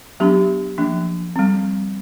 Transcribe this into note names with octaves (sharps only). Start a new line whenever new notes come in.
F#3 B3 D4 G4
F3 A#3 D4
G3 C4